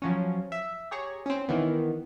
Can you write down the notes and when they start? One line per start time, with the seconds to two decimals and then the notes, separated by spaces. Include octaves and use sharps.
0.02 F3 F#3 C#4
0.52 E5
0.91 G4 G#4 C#5 A#5
1.26 C4 C#4
1.48 D#3 E3 B3